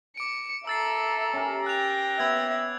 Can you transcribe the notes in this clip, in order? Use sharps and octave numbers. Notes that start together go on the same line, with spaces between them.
D6 C#7 D7
A4 E5 A#5 E6 A6 C7
C#4 G4 A#4
G5 F#6 A#6 F7
B3 E5 E6 G#6